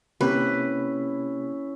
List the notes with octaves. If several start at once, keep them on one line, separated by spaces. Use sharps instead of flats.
C3 A#3 C#4 E4 G4 B4